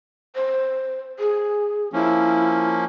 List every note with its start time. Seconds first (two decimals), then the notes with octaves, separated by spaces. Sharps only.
0.35 C5
1.19 G#4
1.93 F3 A#3 C#4 E4